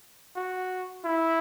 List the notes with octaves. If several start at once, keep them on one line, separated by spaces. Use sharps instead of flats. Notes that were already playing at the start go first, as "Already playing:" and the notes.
F#4
E4